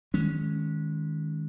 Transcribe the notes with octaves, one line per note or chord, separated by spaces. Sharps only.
D#3 G#3 C#4